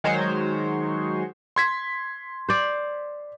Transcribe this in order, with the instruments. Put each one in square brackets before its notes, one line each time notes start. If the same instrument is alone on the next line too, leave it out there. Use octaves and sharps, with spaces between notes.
[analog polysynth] D#3 F#3 G#3 C5 C#5
[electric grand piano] C6 G#6 B6
[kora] C5 D5